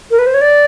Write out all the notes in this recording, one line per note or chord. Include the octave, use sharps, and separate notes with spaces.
A#4
B4
C5
C#5
D5